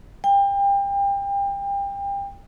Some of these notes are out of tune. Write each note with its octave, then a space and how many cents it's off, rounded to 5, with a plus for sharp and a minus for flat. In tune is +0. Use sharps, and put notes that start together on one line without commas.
G5 +30